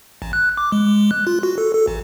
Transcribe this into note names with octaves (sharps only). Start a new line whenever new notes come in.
A1
F#6
D6
G#3
G#3
F#6
F4
F#4
A4
A4
A1